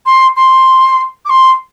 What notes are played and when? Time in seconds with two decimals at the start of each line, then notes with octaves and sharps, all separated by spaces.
0.06 C6
0.36 C6
1.25 D6
1.30 C6